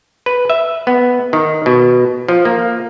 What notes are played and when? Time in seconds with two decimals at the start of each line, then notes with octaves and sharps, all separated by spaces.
0.26 B4
0.50 E5
0.87 B3
1.33 D#3
1.66 B2
2.28 F3
2.45 A#3